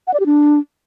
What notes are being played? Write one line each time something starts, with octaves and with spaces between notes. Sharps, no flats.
F#5
D5
G4
D4